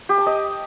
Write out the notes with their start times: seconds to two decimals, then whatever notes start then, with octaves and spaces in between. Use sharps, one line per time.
0.09 G4
0.18 A5
0.27 D#5